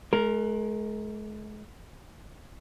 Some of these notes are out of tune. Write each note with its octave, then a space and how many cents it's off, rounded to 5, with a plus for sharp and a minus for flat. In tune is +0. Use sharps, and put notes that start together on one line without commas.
G#3 +40 A#4 +0